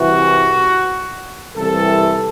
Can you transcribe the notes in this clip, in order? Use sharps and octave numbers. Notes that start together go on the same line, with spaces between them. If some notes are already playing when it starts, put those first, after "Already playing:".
Already playing: C2 C3 E3 F#4
C2 C3 E3 A4